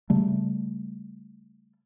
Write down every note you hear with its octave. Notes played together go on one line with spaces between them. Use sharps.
C#3 G3 A3